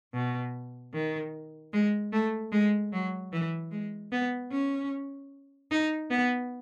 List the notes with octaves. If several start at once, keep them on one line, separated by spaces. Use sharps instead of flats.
B2
D#3
G#3
A3
G#3
F#3
E3
G#3
B3
C#4
D#4
B3